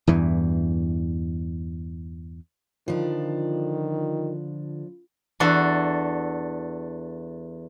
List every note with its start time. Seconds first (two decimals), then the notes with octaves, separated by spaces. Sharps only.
0.07 E2 G2 E3
2.88 D3 D#3 F3 D4 F4
5.40 E2 D4 F#4 A4